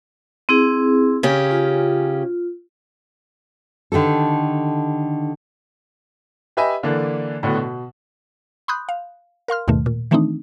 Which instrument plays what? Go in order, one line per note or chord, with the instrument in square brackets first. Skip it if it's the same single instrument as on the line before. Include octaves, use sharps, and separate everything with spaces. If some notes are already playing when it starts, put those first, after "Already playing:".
[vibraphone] C4 E4 G#4
[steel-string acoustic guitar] C#3 C#4 G4
[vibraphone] F4
[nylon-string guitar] D3 D#3 G4 A4
[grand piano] G4 B4 D#5 E5 G#5
D3 E3 A#3 D4
A2 D3 B3 F#4
B2
[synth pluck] B5 C6 D#6 F#6 G6
F5
A#4 F5 C6 F6
D#2 G#2 B2 D#3 A3
A#2
D#3 E3 A3 C4 D4 D#4